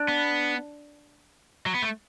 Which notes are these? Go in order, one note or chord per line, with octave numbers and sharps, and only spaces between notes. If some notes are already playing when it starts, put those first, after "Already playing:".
Already playing: D4
B3
F#3
B3
A3